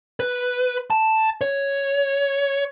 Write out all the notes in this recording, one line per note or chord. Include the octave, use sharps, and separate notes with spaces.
B4
A5
C#5